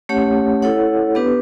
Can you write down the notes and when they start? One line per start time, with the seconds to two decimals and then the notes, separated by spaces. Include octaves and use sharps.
0.09 A3 C#4 G4 C#5 F#5
0.62 E4 A4 C#5 F#5
1.15 B3 D4 G4 B4